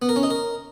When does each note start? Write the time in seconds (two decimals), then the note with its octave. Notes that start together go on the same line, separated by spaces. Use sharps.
0.02 B3
0.09 A#4
0.16 C#4
0.23 D#4
0.30 A#4